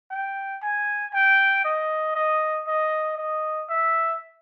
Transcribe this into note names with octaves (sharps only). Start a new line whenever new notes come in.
G5
G#5
G5
D#5
D#5
D#5
D#5
E5